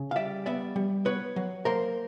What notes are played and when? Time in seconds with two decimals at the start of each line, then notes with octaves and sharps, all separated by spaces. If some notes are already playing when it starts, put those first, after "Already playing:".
Already playing: C#3
0.11 F5
0.16 G3 D5 E5
0.46 B3 D5 E5
0.76 G3
1.05 B3 B4 C#5
1.36 F#3
1.65 A#3 A#4 C5